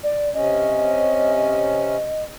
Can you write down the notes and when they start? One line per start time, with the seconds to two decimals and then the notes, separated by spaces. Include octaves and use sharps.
0.03 D5
0.34 C3 C#4 D#5